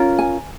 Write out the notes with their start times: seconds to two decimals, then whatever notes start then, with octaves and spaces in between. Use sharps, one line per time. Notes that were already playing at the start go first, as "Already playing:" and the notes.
Already playing: C#4 F4 A#4
0.19 G#5